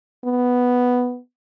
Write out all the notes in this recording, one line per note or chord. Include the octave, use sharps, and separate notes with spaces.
B3